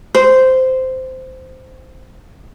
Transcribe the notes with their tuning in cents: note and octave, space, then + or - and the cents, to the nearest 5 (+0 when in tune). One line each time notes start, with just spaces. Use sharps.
C5 -10